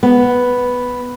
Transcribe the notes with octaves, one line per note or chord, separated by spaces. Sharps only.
B3